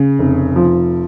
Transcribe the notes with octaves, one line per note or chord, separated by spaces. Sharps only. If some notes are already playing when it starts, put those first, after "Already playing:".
Already playing: C#3
F1
F3